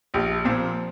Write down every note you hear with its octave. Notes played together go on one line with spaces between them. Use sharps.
A#1 G4
A#2 F3 C4